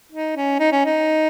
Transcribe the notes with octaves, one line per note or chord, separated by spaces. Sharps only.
D#4
C#4
D#4
C#4
D#4